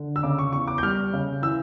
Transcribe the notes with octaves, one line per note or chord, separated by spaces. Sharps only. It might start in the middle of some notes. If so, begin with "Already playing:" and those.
Already playing: D3
E6
C#3 D6
C#6
E2 C#6
D6
G6
G3 F6
C#3
E3 E6